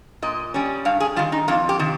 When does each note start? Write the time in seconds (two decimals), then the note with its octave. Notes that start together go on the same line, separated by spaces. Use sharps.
0.22 A#2 D#5
0.54 G3 C#4
0.85 G2 F5
1.00 G#4
1.16 D#3 G3 F4
1.32 D#4
1.48 F2 F4
1.69 G4
1.79 C3 D#3